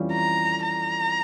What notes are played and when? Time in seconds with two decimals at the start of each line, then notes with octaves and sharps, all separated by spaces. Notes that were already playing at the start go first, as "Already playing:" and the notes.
Already playing: F2 E3 G3 C#4 F4
0.12 A#5
0.65 A#5